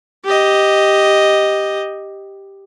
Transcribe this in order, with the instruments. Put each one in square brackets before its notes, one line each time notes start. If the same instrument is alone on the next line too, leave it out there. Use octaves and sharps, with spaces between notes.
[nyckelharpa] G4 D#5